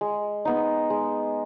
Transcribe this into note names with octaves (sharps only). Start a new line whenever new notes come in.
G#3
B3 D#4
G#3